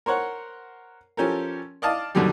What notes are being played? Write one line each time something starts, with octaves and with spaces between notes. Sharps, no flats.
A#4 C5 C#5 F#5
F3 C#4 G4 A4 A#4
D5 D#5 F5 A5 D6
F#2 B2 D3 D#3 F#3 G3